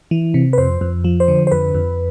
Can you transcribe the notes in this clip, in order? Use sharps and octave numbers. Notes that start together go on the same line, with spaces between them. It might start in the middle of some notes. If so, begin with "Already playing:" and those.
E3
C3
B4
F2 C5
F2
F3
C5
D3
C5
F2 B4
F2